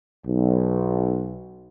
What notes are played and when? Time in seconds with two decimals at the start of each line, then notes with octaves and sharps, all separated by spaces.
0.25 B1